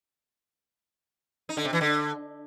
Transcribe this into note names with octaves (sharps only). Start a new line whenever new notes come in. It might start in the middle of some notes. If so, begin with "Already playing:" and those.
D#4
D3
C3
E3
D3